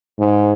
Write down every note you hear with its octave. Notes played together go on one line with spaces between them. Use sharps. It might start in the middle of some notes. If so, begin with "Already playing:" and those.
G#2